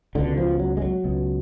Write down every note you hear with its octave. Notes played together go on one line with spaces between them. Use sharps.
C#2 B2 D3
F3
F#3
G#3
F#3
C#2 B2